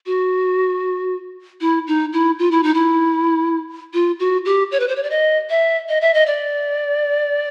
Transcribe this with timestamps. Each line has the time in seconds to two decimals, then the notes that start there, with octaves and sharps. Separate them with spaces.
0.06 F#4
1.61 E4
1.87 D#4
2.13 E4
2.39 F4
2.51 E4
2.63 D#4
2.74 E4
3.94 F4
4.19 F#4
4.45 G4
4.72 C#5
4.80 B4
4.88 C5
4.96 C#5
5.03 D5
5.10 D#5
5.50 E5
5.89 D#5
6.01 E5
6.14 D#5
6.26 D5